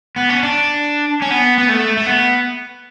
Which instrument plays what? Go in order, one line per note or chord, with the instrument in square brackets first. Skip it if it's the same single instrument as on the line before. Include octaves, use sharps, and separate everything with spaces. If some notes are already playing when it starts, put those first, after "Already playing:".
[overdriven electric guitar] B3
C#4
D4
C#4
B3
B3
A3
A3
B3